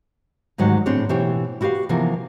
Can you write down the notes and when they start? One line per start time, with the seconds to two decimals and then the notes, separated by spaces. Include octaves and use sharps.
0.58 D2 G#2 D#3 F#3 G4 F#5
0.86 A2 C4 D4 G#4 C#5
1.09 B2 E3 G4 C5 C#5 G5
1.61 E4 F#4 G4 B4 F5
1.89 C3 E3 F3 A#3 B3